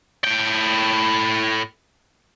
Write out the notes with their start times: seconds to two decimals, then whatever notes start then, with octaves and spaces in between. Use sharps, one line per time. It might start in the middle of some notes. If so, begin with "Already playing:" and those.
0.24 A2 G5